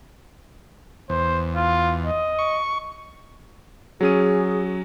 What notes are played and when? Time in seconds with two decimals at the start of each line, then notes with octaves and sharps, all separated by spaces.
1.10 E2 C5
1.55 F4
2.05 D#5
2.39 C#6
4.01 F#3 C#4 G#4 D#7